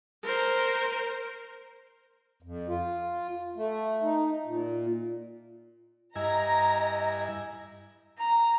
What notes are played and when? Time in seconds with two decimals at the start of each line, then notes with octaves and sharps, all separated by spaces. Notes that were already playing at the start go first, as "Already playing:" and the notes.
0.24 A#4 C5
2.42 F2
2.68 F4
3.56 A3
4.02 D#4
4.46 A#2
6.16 G2 E4 D#5 G#5 A#5
8.18 A#5